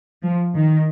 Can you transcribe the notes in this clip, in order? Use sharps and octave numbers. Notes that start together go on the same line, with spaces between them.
F3
D#3